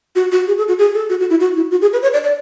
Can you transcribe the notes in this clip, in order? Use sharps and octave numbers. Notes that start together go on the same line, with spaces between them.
F#4
F#4
G#4
A4
F#4
G#4
A4
F#4
F#4
E4
F#4
E4
F#4
G#4
B4
C#5
D5
D5